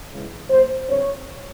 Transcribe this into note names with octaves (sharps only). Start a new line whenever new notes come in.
F#2 C#3 E3 G#3
A#2 F#3 A#3 C5
D3 G3 C4 C#5